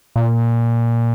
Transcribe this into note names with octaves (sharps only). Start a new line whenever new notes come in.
A#2